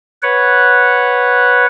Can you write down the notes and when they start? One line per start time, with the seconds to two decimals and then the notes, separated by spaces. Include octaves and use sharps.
0.23 B4 C#5 F#5